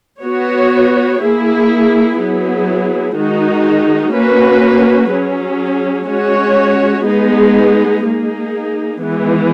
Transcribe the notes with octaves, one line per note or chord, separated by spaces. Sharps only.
B3 F#4 C#5
A#3 E4 G#4
F#3 B3 E4 G#4
D#3 G#3 D#4 F#4
A#3 C#4 F#4 B4
F#3 C#4 G#4
G#3 C#4 F#4 C#5
G#3 B3 D#4 G#4
A#3 D#4 G#4
E3 G#3 B3